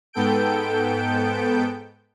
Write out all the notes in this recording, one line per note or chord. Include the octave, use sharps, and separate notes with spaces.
G#2 B3 A4 G5 G6 D7